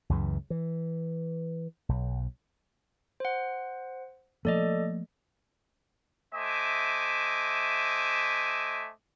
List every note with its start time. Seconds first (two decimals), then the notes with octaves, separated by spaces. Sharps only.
0.09 C#2 F#2 C#3 E3
0.50 E3
1.89 B1
3.20 C5 F#5
4.45 F3 A3 A#3 A4 D5 D#5
6.34 A3 C5 D#5 E5 G#5 D6